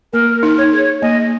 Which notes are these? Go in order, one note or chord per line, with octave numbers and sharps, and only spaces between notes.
A#3 A#4
D#4
C#5
G#4
A#3 D#5